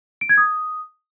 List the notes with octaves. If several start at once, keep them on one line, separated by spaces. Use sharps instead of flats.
D7
G#6
D#6